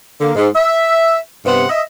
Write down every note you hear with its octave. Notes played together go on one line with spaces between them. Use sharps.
D3 A#3
G#2
E5
G2 C3 B3 C5 F#5
D#5 E5